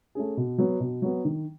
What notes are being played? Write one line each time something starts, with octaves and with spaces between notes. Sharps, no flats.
A3 C#4 G#4
B2
F#3 B3
B2
F#3 B3
D#3